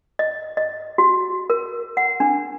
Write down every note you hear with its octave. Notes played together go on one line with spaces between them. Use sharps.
D#5
D#5
F#4
A#4
F#5
D4